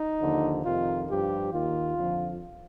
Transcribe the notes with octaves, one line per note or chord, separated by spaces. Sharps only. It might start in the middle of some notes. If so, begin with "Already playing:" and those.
Already playing: D#4
D#2 D3 F3
F2 C3 D#3 F4
G2 F3 G4
D#2 D#3 F4
F2 D3 F3